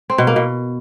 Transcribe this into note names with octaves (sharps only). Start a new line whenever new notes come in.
C4
B2
A#3
B2